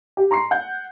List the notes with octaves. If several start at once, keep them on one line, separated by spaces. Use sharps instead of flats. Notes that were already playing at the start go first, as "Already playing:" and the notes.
G4
A#5 C6 C#6 C7
F#5 G6